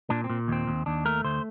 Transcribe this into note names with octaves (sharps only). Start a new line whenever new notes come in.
A#2 D4
C4
A#2
D#2 C4
D#2
D#2 D4
A3 A#4
D2 C5